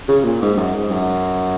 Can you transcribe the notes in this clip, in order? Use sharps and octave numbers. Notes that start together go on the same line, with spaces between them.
C#3
A#2
G#2
F#2
G#2
F#2